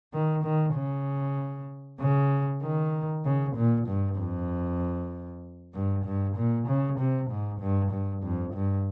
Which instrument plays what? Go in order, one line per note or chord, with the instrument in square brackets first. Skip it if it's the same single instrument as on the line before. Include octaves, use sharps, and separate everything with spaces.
[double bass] D#3
D#3
C#3
C#3
D#3
C#3
A#2
G2
F2
G2
G2
A#2
C#3
C3
G#2
G2
G2
F2
G2